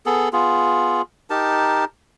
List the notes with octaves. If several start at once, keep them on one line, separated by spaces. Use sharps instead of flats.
B3 G#4 A4
B3 F4 G#4
D#4 G4 A#4 A5